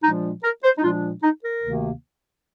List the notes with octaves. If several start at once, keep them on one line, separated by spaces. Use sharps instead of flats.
A#2 F3 G#3 D4 D#4
A#4
C5
D#4
A#2 F3 G#3 D4 F4
D#4
A#4
D2 C3 D#3 A#3